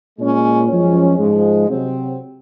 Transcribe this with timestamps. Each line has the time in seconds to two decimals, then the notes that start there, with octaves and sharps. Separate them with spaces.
0.17 A#2 G#3 C#4
0.67 F#2 F3 G#3 C#4
1.17 G#2 F3 G#3
1.68 C3 F#3 C4